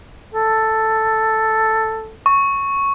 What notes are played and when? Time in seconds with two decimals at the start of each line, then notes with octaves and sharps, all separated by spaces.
0.34 A4
2.26 C#6